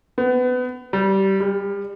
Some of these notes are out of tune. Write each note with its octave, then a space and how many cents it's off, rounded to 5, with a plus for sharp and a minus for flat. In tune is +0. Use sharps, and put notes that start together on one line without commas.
B3 +25
G3 -20
G3 +30